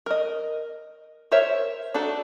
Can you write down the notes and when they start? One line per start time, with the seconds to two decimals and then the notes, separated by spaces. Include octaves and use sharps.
0.06 A#4 D#5
1.31 A#4 C5 C#5 E5
1.94 D4 D#4 F#4 A4